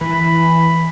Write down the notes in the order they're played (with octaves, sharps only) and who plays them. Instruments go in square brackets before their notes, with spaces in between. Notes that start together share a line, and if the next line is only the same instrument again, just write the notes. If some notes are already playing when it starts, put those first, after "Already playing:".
[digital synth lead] E3 [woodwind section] B5